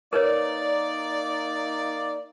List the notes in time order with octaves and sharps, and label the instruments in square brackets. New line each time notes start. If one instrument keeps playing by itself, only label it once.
[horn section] A#3 D#4 D5 [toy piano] A#4 B4 C#5